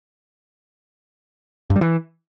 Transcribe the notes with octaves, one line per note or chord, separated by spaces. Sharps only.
G2
G3
E3